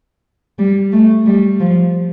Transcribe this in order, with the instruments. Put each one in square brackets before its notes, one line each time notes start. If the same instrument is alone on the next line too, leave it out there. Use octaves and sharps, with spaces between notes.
[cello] G3
A3
G3
F3